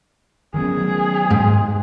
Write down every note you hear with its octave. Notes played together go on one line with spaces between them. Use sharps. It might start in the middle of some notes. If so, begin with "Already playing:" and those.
D#3 F#3 B3 G#4
G#2